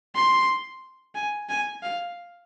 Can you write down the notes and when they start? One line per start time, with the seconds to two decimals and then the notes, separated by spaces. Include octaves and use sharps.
0.15 C6
1.15 G#5
1.49 G#5
1.83 F5